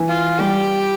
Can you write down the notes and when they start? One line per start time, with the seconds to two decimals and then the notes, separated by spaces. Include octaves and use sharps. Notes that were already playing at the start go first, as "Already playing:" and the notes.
Already playing: E3
0.08 F4
0.39 G3 G4